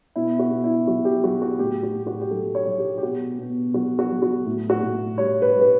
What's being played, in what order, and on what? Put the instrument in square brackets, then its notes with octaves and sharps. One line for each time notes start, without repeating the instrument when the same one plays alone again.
[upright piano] B2 E4
F#4
B2
E4
F#3 F#4
G4
F#3 F#4
F#4
A2 G4
F#4
A2
F#4
G4
F#3 A4
C#5
F#3
G4
G4
B2 F#4
B2
F#3 F#4
F#4
F#3
F#4
A2
F#4
A2
G3 C#5
B4
G3
B4